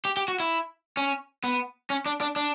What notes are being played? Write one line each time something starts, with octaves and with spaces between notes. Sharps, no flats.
G4
G4
F#4
E4
C#4
B3
C#4
D4
D4
D4